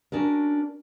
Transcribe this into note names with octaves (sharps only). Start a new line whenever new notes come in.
C#4 D4 F#4 A#4